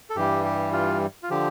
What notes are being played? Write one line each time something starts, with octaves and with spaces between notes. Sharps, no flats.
A4
G2 E3 G3 G4
G4
F4
F4
D3 F3 G4